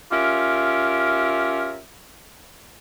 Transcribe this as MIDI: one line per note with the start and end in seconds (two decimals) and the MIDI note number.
0.12 1.78 61
0.12 1.78 65
0.12 1.78 67
0.12 1.78 70
0.12 1.78 76